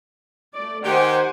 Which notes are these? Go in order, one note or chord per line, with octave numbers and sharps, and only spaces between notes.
A3 D5
D#3 G4 C5 F#5 G#5